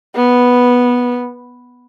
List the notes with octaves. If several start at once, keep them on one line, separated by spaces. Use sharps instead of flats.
B3